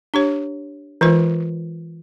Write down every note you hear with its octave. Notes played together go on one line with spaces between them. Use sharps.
D4 G4 C#5
E3 G#3 F4 A#4 C5